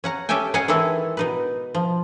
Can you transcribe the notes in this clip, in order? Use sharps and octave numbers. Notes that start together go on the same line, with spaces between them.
C#4 F#5 A#5
C#4 G4 A4 E5 G5 G#5
C#4 C#5 D#5 F5 F#5 G#5
D#3 E3 G#3 E4 A4 G#5
B2 D#4 B4
F3